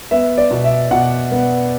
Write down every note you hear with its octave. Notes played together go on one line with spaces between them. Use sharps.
B3 E5
D5
B2
E5
B2 F#5
B3